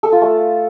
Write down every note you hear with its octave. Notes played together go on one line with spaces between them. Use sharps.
A4
F4
A3